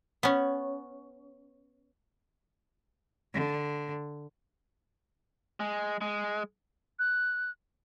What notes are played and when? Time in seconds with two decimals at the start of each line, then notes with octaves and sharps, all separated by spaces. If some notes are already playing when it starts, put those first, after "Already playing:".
0.23 B3 C#4
3.34 D3
5.60 G#3
6.01 G#3
6.99 F#6